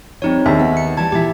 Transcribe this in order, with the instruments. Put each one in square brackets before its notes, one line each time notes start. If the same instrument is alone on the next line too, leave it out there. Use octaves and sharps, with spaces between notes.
[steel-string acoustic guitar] F3 G3 [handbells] C4 D#4 C#5
[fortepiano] D#2 A#5 [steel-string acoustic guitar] D4 G#4 [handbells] E5
[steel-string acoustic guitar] B3
[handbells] C#7
[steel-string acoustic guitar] E3 G3 [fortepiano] A5 [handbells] G#6
[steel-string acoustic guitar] A#2 E3 E4 [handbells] G4 E5